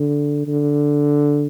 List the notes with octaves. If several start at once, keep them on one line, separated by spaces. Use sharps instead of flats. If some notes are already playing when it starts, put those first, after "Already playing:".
Already playing: D3
D3